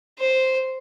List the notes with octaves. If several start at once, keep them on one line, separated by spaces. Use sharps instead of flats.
C5